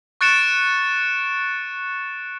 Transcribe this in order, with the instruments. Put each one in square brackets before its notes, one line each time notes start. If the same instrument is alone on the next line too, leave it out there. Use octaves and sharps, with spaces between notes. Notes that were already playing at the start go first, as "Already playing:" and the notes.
[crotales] C#6 F#6 A6 C#7 D7 E7